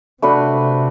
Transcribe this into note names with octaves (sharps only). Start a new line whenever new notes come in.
C3 A3 D4 F#4 B4